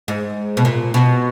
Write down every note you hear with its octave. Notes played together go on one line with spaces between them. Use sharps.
G#2
B2
A#2
B2